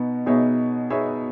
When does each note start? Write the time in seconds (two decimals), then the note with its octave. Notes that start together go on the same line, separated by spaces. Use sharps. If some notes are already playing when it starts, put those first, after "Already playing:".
Already playing: B2 B3 D#4
0.26 B2 B3 D#4 G#4 C#5 E5
0.90 B3 D#4 G#4 C#5 E5